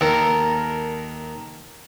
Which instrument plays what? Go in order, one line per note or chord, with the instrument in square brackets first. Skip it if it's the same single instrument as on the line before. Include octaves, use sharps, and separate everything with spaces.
[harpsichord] D#2 [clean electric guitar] A4 A#4